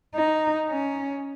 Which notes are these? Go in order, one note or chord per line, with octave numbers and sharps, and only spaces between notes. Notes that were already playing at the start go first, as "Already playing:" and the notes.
D#4
C#4